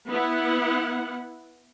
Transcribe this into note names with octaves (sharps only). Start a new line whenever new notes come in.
B3 E4 F#5